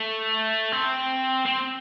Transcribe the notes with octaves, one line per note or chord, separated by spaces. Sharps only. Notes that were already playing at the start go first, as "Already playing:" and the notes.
Already playing: A3
C4
C4